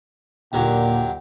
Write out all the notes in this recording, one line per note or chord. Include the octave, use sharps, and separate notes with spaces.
D#2 A#2 D3 F#3 G5